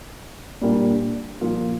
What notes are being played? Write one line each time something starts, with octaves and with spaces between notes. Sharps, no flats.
A#2 G3 A#3 D4
A#2 F3 A#3 F4